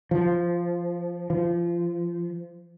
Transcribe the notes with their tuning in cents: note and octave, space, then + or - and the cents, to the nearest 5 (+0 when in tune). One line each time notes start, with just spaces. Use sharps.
F3 -10
F3 -25